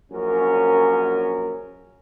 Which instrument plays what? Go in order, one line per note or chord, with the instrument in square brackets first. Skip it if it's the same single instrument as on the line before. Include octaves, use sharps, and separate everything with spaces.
[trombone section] A#1 F#2 C#4 A#4